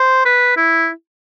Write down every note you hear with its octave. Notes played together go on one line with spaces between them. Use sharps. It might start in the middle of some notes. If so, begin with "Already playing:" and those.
Already playing: C5
B4
E4